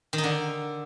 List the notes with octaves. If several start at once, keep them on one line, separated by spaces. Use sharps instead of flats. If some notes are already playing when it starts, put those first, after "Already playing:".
D#3
D#4
D3